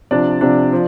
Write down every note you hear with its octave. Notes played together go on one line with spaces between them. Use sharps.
C3 F3 D4 D5
C3 F3 D4
F3